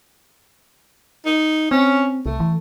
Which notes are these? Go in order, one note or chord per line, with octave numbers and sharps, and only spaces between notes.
D#4
C4 C#4
C2 A3
E3